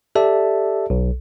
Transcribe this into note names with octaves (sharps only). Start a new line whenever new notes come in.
G4 A4 D5 E5 A5
B1